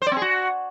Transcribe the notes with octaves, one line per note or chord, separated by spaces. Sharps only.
C5
D5
C4
G#4
F#4